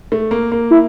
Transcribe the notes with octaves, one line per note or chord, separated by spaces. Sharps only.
A3
A#3
A#3
E4